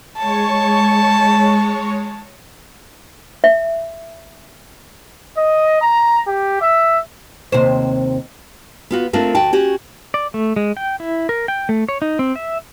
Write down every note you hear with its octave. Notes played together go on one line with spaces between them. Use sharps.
G#3 C#5 A5 C#6
E5
D#5
A#5
G4
E5
D#2 C3 C5
B3 F4 F#4
A3 C4 D4 F4 A#4
D2 F#4 G5 A5
C#4 F#4 G4
D5
A3
G#3
G5
E4
A#4
G5
A3
C#5
D#4
C4
E5